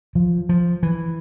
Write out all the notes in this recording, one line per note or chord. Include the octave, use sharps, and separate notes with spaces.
F3
F3
E3